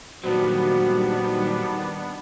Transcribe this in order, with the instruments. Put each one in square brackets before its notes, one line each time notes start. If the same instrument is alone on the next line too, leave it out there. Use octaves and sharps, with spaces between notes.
[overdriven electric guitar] A#2 F#3 [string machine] D#3 G3 [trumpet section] B3 D4 [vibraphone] F#4 C5